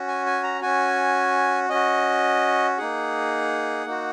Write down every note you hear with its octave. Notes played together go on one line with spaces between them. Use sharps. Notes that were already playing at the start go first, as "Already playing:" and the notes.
Already playing: C#4 F#4
G#5
G#5
A#5
C#4 F#4 G#5
C#4 F#4 D#5
A#3 D#4 G#4 F#5
A#3 D#4 F#4